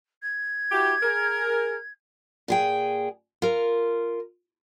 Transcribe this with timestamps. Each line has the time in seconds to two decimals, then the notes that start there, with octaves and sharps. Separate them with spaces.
0.22 G#6
0.72 E4 F#4 G4
1.03 G#4 A#4
2.48 A#2 G#4 G5
3.42 F4 A#4